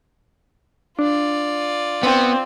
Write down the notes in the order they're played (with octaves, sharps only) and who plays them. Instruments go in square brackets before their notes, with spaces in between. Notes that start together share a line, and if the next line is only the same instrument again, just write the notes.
[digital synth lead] D4 [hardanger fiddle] F4 D5
[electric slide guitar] B3 [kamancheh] C4